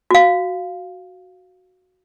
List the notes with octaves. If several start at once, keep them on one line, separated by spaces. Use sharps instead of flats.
F#4 F5